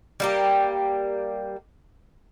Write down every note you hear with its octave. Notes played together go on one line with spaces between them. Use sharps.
G3 A#3 G4